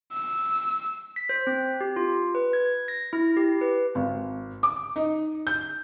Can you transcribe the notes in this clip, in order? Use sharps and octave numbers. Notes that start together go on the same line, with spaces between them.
E6
B6
C5
C4
G4
F4
B4
G#6
A#6
E4
G4
B4
G#1
D6
D#4
G6